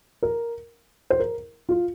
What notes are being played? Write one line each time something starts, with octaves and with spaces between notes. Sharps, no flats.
A#4
C5
A#4
F4